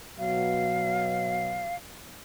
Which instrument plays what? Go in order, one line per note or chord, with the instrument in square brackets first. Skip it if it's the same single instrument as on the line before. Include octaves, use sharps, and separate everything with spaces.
[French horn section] B2 F#3 [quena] F5